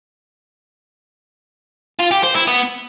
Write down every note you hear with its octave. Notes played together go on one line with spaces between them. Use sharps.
F4
G4
C5
E4
B3